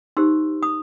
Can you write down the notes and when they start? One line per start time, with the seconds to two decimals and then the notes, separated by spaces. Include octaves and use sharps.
0.17 D#4 G4 C5 C6 E6
0.63 B5 D#6